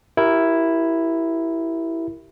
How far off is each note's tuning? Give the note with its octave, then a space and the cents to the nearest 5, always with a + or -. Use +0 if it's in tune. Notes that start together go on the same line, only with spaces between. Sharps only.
E4 +0 G4 -25 A#4 +0